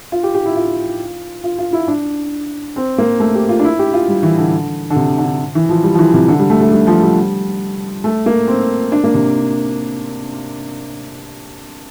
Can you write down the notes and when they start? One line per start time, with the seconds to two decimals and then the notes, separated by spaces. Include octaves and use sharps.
0.12 F4
0.23 G4
0.35 G4
0.46 E4
0.56 F4
1.44 F4
1.59 F4
1.73 E4
1.88 D4
2.76 C4
2.98 A#3
3.20 A3
3.35 G4
3.49 F4
3.60 D4
3.64 E4
3.79 G4
3.93 F4
4.08 G3
4.23 E3
4.37 D3
4.90 D3
4.96 C3
5.18 D3
5.55 E3
5.69 F3
5.83 G3
5.94 F3
5.99 E3
6.14 C3
6.28 D3
6.39 G3
6.50 A3
6.61 A3
6.71 G3
6.87 F3
7.01 G3
8.04 A3
8.26 A#3
8.48 C4
8.92 D4
9.04 A#3
9.14 C3